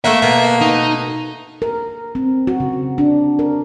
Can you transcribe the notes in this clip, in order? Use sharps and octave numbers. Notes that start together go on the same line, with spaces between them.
A3 A#3 E5 F#5
B2 A#3
D#4
A#4
C4
F#4
C#3
D4
A#4